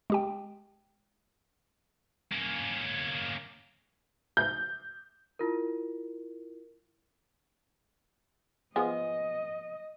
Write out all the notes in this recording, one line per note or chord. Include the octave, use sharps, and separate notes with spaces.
G#3 G4 G5
A#3 C#4
G6
E4 F4 A#4
F3 B3 G#4 D#5